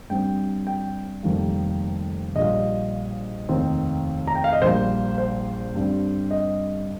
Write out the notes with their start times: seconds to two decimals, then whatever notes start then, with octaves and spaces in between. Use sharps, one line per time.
0.10 G2 G3 C4 G5
0.67 G5
1.23 F1 F2 D#3 G3 A#3
2.35 A#1 A#2 G3 D#5
3.49 F1 D#2 D#3 C4
4.27 A#5
4.35 G5
4.44 F5
4.53 D#5
4.62 A#1 A#2 G3 A#3 C5
5.18 C5
5.74 G1 G2 G3 C4
6.31 D#5